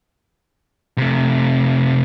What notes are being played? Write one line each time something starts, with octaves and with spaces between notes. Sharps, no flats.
C3 A3